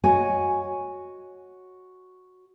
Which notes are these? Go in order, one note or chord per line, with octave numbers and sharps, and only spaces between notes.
F#4 C#5 D#5 G#5